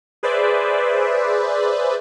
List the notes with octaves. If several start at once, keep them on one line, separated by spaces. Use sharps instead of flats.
G#4 B4 C5 D5 E5